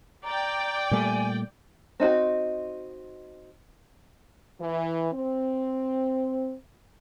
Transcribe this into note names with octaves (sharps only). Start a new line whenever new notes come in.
D5 G5 A#5
A#2 G3 A3 G#5
C4 D#4 E4 F#4
E3
C4